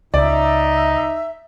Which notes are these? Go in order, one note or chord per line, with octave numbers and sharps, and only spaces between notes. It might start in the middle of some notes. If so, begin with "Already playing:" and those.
C#2 D#4 D5 E5